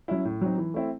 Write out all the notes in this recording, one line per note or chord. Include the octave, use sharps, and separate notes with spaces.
F#3 C#4 E4
A2
F#3 C4 D#4
E3
A3 C4 E4